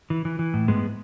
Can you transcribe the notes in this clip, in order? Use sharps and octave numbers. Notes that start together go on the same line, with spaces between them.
E3
E3
E3
A2
G#2 G#3 B3